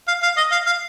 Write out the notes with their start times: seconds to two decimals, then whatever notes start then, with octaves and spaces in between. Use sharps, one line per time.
0.08 F5
0.23 F5
0.37 D#5
0.52 F5
0.66 F5